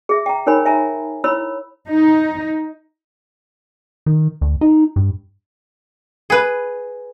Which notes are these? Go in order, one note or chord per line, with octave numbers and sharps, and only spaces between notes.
G#4 E5
G5 A#5
D#4 A#4 C#5 G#5 B5
E5 G#5 A#5
E4 C#5 B5 E6
D#4
D#3
D2
D#4
G2
G#4 B4